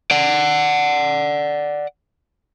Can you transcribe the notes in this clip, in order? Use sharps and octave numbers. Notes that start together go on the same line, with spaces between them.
D5 F#5